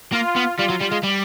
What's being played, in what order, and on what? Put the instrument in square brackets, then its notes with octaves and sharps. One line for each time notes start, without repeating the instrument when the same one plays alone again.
[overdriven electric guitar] A#3 [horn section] F4
[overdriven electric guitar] B3
[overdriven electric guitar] G3 [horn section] F4
[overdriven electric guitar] F#3
G3
G#3
G3